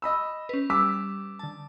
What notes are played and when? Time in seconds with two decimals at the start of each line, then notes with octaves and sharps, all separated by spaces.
0.02 D#5 B5 E6
0.49 C#4 B4
0.70 G3 D6 E6 B6
1.39 D3 A5